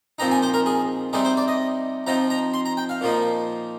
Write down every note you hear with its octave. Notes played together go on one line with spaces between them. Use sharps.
A#2 F3 C4 D#4 A#5
G#5
C5
A#4
G#4
C3 G3 C4 D#4 G#4
C5
D5
D#5
F3 C4 D#4 A#5
A#5
C6
A#5
G5
F5
A#2 F3 A#3 D#4